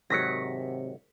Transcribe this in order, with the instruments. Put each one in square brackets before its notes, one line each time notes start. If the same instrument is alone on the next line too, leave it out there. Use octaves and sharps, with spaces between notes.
[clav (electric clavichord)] G#1 D#3 F#3 [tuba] C3 [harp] A#6 B6 C#7